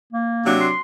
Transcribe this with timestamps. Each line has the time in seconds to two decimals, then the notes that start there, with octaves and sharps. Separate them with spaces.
0.13 A#3
0.46 C3 F#3 D4
0.60 C6